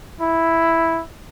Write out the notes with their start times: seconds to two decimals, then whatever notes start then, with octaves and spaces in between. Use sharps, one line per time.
0.21 E4